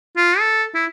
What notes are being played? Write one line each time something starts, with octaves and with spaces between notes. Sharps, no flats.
F4
A4
E4